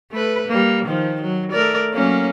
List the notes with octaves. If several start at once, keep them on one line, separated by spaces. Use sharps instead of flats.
A3 B4
G3 A#3
D#3 F3
F#3
A3 A#4 D5
F#3 A#3 C#4